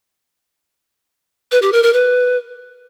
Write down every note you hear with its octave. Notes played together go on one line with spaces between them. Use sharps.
B4
G4
A#4
A#4
B4